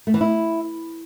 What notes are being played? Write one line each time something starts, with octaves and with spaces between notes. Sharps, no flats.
A3
E3
E4